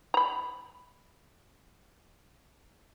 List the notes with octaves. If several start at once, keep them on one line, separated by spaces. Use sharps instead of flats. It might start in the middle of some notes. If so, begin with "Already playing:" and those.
A#5 B5